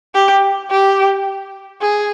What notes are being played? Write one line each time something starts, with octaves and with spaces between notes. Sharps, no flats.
G4
G4
G#4